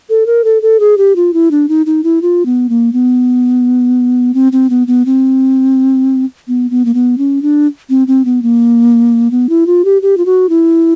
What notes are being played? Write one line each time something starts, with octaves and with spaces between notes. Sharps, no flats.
A4
A#4
A4
A4
G#4
G4
F4
E4
D4
D#4
D#4
E4
F4
B3
A#3
B3
C4
C4
B3
B3
C4
B3
B3
A#3
B3
C#4
D4
C4
C4
B3
A#3
B3
E4
F4
G4
G4
F4
F#4
E4